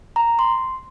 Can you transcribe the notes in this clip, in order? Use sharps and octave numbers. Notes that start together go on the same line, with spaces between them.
A#5
C6